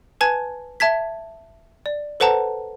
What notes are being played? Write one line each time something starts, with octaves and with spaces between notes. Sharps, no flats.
B4 G#5 A5 G#6
E5 A5 G#6 B6
D5
A4 B4 C5 F#5 A5 A#5